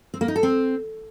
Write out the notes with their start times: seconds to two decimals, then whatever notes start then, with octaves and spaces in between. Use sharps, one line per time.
0.14 C4
0.21 A#3
0.28 D#4
0.36 A4
0.43 C4